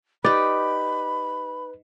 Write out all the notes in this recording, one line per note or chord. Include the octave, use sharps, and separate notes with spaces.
D#4 G4 B4 D5 B5